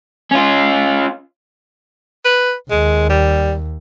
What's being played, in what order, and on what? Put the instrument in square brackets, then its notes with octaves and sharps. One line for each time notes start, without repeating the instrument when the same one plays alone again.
[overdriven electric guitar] C#4 F4
[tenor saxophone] B4
[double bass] D#2 [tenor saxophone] G#3
[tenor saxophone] G3